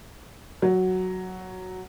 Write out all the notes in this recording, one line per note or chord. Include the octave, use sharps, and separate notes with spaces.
F#3